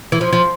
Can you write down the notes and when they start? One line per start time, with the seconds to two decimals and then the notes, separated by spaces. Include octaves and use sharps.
0.12 E3
0.21 F3
0.33 F3